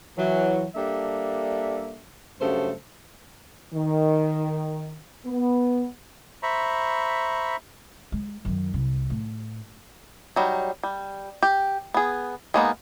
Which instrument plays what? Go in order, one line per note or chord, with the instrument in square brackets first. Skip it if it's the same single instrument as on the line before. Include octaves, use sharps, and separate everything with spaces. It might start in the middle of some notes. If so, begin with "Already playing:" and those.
[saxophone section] E3 F#3
G3 A#3 D4 A4 E5
G2 C#3 F#3 A3 A4 C5
[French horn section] D#3
B3
[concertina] C5 E5 A#5 B5 C#6
[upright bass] G#3
F#2 D#3
C2
A2
[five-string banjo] F#3 G3 D#4
G3
G4
B3 G#4
G#3 A#3 B3 D#4